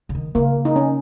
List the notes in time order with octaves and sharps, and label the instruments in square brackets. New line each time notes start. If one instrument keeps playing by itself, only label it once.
[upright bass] C#3
D#3
[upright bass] C#3 [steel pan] A#3
[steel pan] D#4
C#4